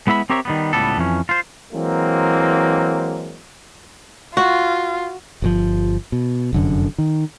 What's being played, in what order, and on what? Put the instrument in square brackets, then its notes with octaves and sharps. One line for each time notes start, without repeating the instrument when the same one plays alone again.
[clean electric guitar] G#3 B3 E4 E5 B5
C4 G4 A#4 C#5 E5
D#3 G3 B3
C#2 A2 G3 B3 A4
F2 E3 C#4
F4 C5
[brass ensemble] E3 F#3 G#3 A#3 C4
[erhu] F4 [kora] F#4
[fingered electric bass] G1 A#2 F3
B2
F1 F#2 D3
D#3